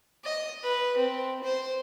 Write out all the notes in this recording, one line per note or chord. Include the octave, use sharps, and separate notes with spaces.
D#5
B4
C4
C5